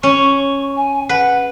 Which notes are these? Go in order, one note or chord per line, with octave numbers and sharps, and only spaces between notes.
C#4 C#6
G#5
B4 F#5